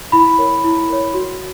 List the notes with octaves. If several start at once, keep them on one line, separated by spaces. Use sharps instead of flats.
E4 B5
A#4 C#5
E4
A#4 C#5
F#4